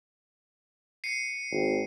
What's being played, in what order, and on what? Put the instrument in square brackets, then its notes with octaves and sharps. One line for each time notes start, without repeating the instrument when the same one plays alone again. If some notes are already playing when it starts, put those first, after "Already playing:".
[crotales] C7 C#7 D#7
[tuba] G#1